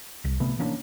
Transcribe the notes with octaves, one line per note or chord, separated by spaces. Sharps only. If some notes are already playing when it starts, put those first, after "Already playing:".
C2
C3 A3 B3
E3 A#3 C#4 D4